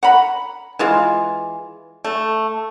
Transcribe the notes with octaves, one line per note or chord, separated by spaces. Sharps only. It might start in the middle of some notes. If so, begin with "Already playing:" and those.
F#5 A#5 B5
E3 G#3 F4
A3